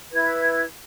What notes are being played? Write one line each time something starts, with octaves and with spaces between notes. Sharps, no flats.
E4 B4 G#6